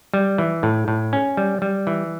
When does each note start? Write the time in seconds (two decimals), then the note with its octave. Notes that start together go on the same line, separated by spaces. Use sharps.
0.14 G3
0.38 E3
0.63 A2
0.88 A2
1.13 C#4
1.37 G3
1.62 G3
1.87 E3